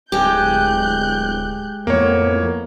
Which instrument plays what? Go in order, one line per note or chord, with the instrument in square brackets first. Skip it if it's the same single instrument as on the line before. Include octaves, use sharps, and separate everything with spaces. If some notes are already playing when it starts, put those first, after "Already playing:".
[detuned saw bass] D1 [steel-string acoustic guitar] G#3 G4 [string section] F#6 G6
[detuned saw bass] F2 [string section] A2 F3 B3 [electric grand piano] A#3 C#5